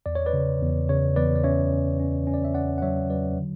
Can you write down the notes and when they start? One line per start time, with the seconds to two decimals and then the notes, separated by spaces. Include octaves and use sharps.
0.06 E2 D5
0.15 C#5
0.26 B4 D5
0.33 C#3
0.61 E2
0.89 C#3 C#5
1.16 E2 B4 D5
1.35 D5
1.44 C#4 C#5 E5
1.72 C#4
2.00 C#4
2.27 C#4
2.34 D5
2.44 E5
2.54 C#4 D5 F#5
2.78 F#5
2.82 F#3 C#5 E5
3.10 F#3 B4 D5
3.38 D3